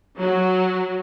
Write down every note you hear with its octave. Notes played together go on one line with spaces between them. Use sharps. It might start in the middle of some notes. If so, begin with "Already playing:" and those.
F#3